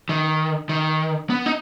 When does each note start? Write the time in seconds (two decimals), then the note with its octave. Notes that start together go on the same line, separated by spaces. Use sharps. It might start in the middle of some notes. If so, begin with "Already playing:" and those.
0.09 D#3
0.69 D#3
1.30 B3
1.46 D#4